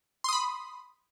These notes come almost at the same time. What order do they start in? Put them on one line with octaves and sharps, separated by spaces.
C6 D#6 B5